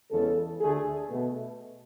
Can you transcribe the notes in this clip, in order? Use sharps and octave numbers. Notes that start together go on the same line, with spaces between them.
E2 C#3 G#3 A4
D2 D3 A3 G#4
B2 A3